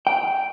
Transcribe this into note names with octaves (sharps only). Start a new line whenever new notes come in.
G5